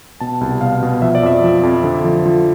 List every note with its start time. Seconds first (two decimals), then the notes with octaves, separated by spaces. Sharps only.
0.20 B2 A5
0.41 C2
0.61 B2 F5
0.82 B2
1.02 F3 E5
1.15 D5
1.23 F2 E5
1.44 F3
1.63 F2
1.84 D3
2.04 F3
2.26 F3